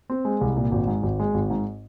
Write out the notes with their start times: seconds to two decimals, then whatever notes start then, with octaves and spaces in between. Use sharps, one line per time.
0.10 C4
0.25 G#3
0.41 C2
0.57 A#2
0.71 G#1
0.87 G#2
1.03 G#1
1.19 G#3
1.34 G#1
1.50 G#2